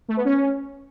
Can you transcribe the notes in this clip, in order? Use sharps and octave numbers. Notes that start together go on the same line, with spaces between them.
A3
B3
C#4